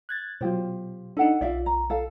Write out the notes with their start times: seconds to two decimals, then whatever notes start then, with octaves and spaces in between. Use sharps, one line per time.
0.09 F#6 G#6 A6
0.41 B2 F#3 F4 G4 C5
1.17 D4 D#4 A4 F#5
1.41 B1 F4 D5 E5 F5
1.66 A#5
1.90 A4 F5